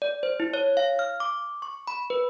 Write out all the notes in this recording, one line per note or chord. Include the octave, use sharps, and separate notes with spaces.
D5
C5
E4
C#5
F5
F6
D6
C#6
B5
B4